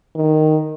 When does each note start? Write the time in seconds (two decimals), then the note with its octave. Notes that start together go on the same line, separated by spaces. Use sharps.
0.16 D#3